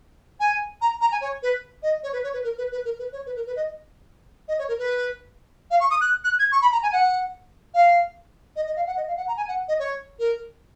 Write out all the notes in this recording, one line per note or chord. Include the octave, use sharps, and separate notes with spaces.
G#5
A#5
A#5
G#5
C#5
B4
D#5
C#5
B4
C#5
B4
A#4
B4
B4
A#4
B4
C#5
B4
A#4
B4
D#5
D#5
C#5
A#4
B4
F5
C#6
D#6
F#6
F#6
G#6
C#6
B5
A#5
G#5
F#5
F5
D#5
D#5
F5
F#5
D#5
F5
F#5
A#5
G#5
F#5
D#5
C#5
A#4